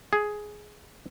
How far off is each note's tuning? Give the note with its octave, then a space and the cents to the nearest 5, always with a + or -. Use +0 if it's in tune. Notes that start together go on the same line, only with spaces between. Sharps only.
G#4 +10